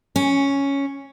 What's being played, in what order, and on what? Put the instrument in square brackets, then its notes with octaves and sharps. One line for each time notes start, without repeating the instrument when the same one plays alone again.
[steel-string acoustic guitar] C#4